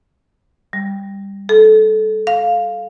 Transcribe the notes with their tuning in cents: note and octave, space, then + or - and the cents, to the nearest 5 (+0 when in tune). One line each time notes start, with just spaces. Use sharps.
G3 +15
A4 -20
F5 +5